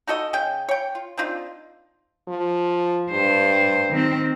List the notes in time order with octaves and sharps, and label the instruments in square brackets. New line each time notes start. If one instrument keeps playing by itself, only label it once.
[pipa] D#4 F#4 A4 D#5
C#3 C#4 G5
C#5 G5
F4
C4 D4 D#4 F4
[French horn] F3
[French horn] G2 [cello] C5
[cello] D#3 C4